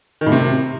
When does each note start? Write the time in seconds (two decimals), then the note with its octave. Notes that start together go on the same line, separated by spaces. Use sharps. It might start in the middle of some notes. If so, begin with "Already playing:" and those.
0.21 D#3
0.26 A2
0.32 C3